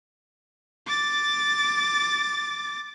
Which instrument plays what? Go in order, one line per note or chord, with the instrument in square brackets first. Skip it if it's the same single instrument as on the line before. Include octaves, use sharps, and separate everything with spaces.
[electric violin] D6 A6